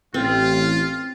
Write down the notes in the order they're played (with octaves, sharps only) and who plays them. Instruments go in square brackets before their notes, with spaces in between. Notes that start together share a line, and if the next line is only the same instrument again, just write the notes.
[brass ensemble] A1 [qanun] C4 [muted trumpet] F4